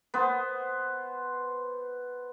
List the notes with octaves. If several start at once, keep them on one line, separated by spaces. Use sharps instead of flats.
B3 C5